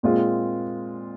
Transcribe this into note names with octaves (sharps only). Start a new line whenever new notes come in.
A#2 G#3 C4 F4